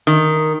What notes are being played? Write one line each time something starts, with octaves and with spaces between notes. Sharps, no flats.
D#3